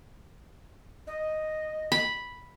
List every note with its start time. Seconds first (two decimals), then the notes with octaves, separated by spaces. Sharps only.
1.07 D#5
1.92 B5